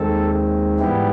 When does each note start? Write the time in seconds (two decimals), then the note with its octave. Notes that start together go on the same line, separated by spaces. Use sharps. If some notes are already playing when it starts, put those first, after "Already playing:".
Already playing: D#2 D#3 G#3 C4 A4
0.79 G#2 E3 G3 B3 E4 G4